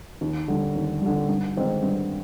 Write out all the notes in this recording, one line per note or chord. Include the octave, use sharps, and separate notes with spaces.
D#2
D3 G3
D#2
D3 G3
G2
D#3 G#3 C4 D#4
G2